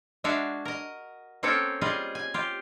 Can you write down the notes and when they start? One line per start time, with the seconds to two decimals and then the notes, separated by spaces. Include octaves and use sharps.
0.24 G#3 D4 F#4 E5 F5
0.65 A#4 D#5
1.43 A#3 C4 C#4 A4 C#5
1.81 G3 F4 G#4 D#5
2.15 G#5
2.34 F4 G4